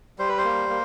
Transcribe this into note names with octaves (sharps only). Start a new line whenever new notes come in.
G3 C5
B4
C5
A#3
A#3